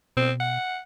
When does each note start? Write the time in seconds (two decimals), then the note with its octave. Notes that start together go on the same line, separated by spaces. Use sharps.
0.17 B2 C4
0.40 F#5